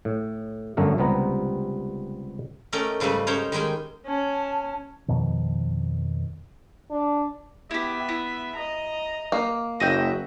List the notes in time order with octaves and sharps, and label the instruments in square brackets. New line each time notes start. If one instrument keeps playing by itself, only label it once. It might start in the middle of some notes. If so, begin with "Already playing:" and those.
[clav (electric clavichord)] A2
G1 F#2 D3 A3 A#4
C#2 C3 G3 B3 A#5
[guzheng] A3 C#4 A#4 D5 D#5 G5
G#2 C#3 G3 A3 B4
C#4 D#4 C5 C#5 G5 A#5
D#3 G3 G#3 G5 G#5
[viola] C#4 [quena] A5
[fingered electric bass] F2 B2 D#3 F3
[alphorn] D4
[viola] B3 E5 [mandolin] E4 G4
[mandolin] E4
[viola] D#5 A#5
[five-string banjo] A#3
[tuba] F#1 [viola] F#4 [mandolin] D#5 E5 G5